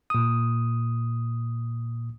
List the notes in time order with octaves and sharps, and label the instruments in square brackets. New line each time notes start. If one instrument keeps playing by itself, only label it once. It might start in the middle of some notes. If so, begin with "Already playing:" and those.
[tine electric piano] A#2 D#6